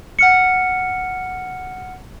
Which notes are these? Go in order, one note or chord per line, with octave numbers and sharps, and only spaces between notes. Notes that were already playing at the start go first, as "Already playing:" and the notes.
F#5 F6 C#7